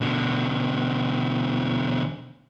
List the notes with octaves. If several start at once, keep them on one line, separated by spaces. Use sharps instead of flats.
B2 D3